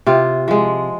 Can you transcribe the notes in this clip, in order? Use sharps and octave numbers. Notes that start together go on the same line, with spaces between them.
C3 F4
F3 G#3